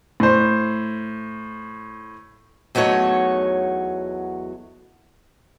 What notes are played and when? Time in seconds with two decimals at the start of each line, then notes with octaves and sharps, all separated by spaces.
0.20 A2 C5
2.75 E2 F#3 A3 D#4 C#5